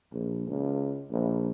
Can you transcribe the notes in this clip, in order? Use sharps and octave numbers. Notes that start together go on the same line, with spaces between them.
A#1
C#2
A#1